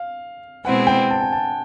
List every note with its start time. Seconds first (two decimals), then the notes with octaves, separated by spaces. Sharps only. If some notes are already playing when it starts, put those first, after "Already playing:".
Already playing: F5
0.64 B2 G#3 C4 E4 G#4 F#5
0.87 G5
1.10 A5
1.20 G#5
1.32 A5